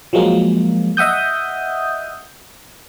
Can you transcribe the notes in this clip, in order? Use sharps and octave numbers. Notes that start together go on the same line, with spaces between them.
F3 F#3 G#3 A#3
D#5 E5 F#5 D#6 G6